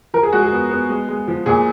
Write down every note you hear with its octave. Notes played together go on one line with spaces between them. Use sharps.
F3 A#4
G#4
G#3 F#4
G#4
B3
B3
G#3
G#3
F3
A#2 G#4